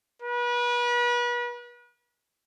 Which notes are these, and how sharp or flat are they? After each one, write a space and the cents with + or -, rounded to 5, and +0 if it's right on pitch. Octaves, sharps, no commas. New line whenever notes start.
B4 -35